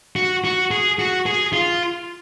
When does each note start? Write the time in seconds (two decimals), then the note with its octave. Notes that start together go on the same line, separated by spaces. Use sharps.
0.16 F#4
0.44 F#4
0.71 G#4
0.99 F#4
1.26 G#4
1.53 F4